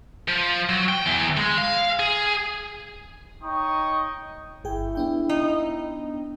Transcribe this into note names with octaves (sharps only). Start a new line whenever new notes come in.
F3
F#3
G5
E2
G#3
F5
G#4
D#4 C#5 G5 A#5 C#6 D#6
G1 E4 G#4 G5
B3 D4 G5
D#4